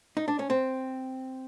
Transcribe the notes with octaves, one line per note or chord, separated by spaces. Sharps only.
D#4
D4
C#4
C4